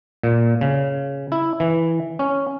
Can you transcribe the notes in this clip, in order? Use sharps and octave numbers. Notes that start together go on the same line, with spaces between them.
A#2
C#3
E4
E3
C#4